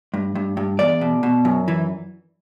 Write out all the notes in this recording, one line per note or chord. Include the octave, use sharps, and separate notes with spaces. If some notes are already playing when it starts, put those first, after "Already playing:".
G2
G2
G2
E2 D5
B2
B2
F#2
E3